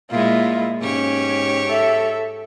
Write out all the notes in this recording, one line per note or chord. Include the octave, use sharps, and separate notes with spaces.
A#2 G#3 E4 F4
G#2 C#4 G4 C#5
A4 E5